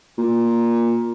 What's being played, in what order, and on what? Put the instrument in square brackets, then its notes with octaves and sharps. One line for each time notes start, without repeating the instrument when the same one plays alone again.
[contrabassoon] A#2